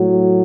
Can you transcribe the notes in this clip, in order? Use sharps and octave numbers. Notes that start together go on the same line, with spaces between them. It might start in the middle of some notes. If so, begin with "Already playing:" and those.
Already playing: A2 F#3